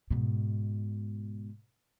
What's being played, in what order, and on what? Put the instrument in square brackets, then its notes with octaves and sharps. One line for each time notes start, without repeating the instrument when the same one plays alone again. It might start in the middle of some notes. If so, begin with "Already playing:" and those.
[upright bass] G#2 B2